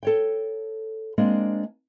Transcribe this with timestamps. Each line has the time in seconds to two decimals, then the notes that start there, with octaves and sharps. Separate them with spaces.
0.03 A4 C#5 G5
1.18 G#3 A#3 C4 D4